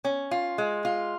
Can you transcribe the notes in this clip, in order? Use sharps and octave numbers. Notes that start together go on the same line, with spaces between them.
C#4
F4
G#3
F4